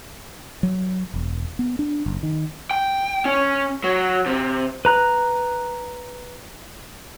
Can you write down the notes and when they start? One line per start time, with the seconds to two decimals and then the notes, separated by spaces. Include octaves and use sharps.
0.63 F#3
1.14 E1
1.59 B3
1.79 D4
2.06 F#1
2.23 D#3
2.71 G5
3.25 C#4
3.84 F#3
4.26 C3
4.85 B4 A#5 F#6